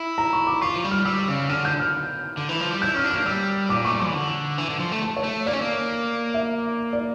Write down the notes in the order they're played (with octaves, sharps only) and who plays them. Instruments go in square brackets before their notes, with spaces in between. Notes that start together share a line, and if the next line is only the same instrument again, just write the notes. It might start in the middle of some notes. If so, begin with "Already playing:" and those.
Already playing: [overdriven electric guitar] E4
[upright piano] A#5
C#6
D6
[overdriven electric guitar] F4 [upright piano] C#6
[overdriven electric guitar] F3
G3
[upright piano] F6
[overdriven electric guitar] G3 [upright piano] E6
[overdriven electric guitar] C#3
[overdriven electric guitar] D3 [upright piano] F6
[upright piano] G6
F6
[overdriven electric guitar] D3
E3
F3
G3
[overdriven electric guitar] E4 [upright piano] G6
[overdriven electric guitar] C#4 [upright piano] F6
[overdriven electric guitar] D4
[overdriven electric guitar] A#3 [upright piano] F6
[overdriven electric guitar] G3 [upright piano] E6
[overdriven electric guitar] A#2 [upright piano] D6
[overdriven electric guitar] A3 [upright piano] C#6
[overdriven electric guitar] G3
[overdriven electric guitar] F3 [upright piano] C#6
[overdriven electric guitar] E3
D3
E3
D3
F3
A3
[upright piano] A5
C#5
[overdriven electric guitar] A3
[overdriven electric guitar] A#3 [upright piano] D5
[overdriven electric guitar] C#4
A#3
[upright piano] E5
D5